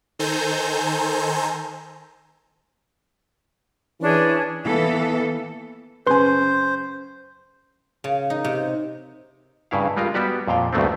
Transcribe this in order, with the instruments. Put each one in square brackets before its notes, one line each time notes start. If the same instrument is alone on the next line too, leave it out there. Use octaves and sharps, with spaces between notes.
[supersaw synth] D#3 A4 C5 G#5 A#5 G6
[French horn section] E3 [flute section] C#4 D4 G#4
[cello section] E3 A#3 B3 A4
[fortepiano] F#2 C#3 G#5 [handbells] B4 C6 [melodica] C5
[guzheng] C#3
D#4
C3
[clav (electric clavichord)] G2 C#3 E4 F5
G3 G#3 F4 A#4
G3 B3 F#4 G4 D5
F2 A#2 F5 G5
D2 G2 F#3 A3 B3 C4